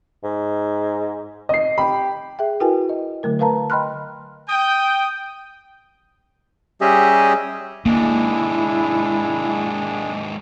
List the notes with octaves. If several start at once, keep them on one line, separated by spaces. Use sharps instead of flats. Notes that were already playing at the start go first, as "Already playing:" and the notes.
G#2
D#5 C7
G4 B5
G#4 E5 G5
E4 F#4 A#4 B4 G5 G#5
D#5
D3 F#3 A3 A#4
A#4 B4 F5 A5 A#5
D#5 G5 B5 C6 F6 F#6
G5 D#6
G3 C#4 G4 G#4 D#5 E5
D#2 G#2 G#3 A#3 D4 E4